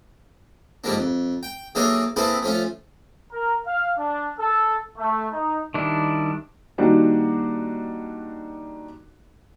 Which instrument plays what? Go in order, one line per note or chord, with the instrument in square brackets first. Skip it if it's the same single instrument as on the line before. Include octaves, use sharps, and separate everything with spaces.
[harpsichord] G#2 D3 F3 G3 A#3 D4
F2
G5
E3 F#3 A#3 D4 G#4 A4
A#3 C4 E4 G#4 A4 B4
F3 A3 C#4 F4
[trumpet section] A#4
F5
D4
A4
A3
D#4
[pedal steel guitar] D#3 G3 D4 E4
[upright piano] D#3 G3 A#3 D4 D#4 F#4